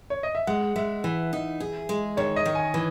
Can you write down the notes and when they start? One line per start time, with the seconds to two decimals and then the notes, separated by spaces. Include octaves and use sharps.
0.10 C#5
0.23 D#5
0.35 E5
0.47 G#3 F#5
0.76 G#3 E5
1.04 E3
1.33 D#4
1.60 G#4
1.89 G#3
2.17 D#3 C#5
2.36 D#5
2.46 D#3
2.55 G#5
2.74 E3